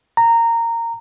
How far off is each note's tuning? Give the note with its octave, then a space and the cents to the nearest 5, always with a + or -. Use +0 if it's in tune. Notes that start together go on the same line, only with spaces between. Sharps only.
A#5 -15